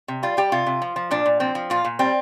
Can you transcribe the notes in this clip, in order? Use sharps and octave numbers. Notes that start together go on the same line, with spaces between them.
C3
G3 F4
G3 G4
C3 F4
C3
F3
F3
A#2 D4
A#2
F3 C4
F3
A#2 F4
A#2
G3 C4